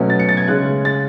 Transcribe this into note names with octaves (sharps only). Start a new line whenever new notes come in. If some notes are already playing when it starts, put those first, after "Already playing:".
Already playing: B2 F#3 A3 C#4
A6
C#7
A6
G#6
C#3 G#3 C#4 F#6
A6